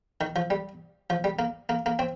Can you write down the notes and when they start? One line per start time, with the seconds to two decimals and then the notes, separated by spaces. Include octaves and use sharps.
0.21 D#3
0.36 F3
0.50 G3
1.10 F3
1.24 G3
1.39 A#3
1.69 A#3
1.86 A#3
1.99 C4